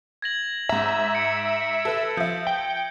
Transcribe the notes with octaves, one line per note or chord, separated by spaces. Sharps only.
G#6 A#6 F#7
G#2 E5 A#5
G#6 C#7 D7
A4 B4
F3 E5 G6
G5